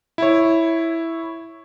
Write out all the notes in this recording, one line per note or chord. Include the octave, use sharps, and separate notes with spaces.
E4 C#5